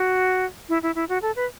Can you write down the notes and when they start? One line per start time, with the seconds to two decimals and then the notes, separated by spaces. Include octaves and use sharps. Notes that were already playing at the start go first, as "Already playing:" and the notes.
Already playing: F#4
0.69 E4
0.83 E4
0.95 E4
1.09 F#4
1.22 A4
1.36 B4